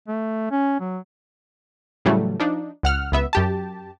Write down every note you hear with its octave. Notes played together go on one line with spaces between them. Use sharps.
A3
C#4
F#3
A2 C#3 E3 F#3 G3 A3
F3 D4 D#4
C#2 F#5 F6
C#2 B3 E5
F#2 G4 A5